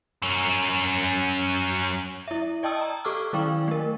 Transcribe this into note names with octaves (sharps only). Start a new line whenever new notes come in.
F#2 C#4
E4 E5
D5 D#5 G5 A5 D#6 E6
A#5
G4 A4 C#6 D6 E6 F6
D#3 F#3 E4 F5 G5 C#6
A3 A#4